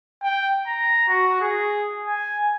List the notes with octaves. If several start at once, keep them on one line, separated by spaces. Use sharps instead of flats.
G5
A#5
F#4
G#4
G#5